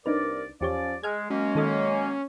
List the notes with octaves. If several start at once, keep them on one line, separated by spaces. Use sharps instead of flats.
C2 D4 D#4 A#4 B4 D5
E2 F3 C#4 G4 C#5 D5
G#3 G#5 F6 G#6
F#3 G#3 A#3 C#4
D#3 A4 D#5